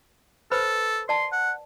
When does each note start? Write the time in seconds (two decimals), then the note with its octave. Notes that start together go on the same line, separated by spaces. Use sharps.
0.51 A4 B4 C5 B5
1.09 D5 A5 C6
1.32 F#5